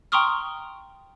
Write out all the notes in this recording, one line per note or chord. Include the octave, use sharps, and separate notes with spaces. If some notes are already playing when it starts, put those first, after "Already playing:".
G5 A#5 C6 C#6 D#6 F6